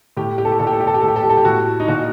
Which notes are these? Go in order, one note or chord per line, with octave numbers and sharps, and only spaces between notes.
A2 G4
G4
A4
G4
A#2 A4
G4
A4
G4
A4
G4
A2 A4
G4
A4
G4
A4
G4
A2 F#4
D#4
A#2 F#4